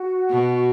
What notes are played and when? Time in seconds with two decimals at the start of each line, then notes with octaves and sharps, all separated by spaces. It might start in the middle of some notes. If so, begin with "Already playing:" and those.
Already playing: F#4
0.30 B2